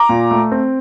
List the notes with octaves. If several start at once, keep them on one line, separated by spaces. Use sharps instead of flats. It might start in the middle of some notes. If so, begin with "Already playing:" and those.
Already playing: A#5 D6
A#2
A3
C4